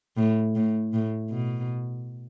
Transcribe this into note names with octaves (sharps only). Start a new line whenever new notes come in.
A2
A2
A2
B2